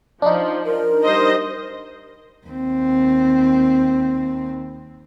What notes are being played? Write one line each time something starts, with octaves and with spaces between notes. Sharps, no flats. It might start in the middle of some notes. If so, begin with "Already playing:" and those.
F3 D4 D#4
A#4
G3 C5 D#5
D#2 C4